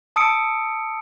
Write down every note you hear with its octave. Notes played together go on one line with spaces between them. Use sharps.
A5 D#6 E6 C#7 D7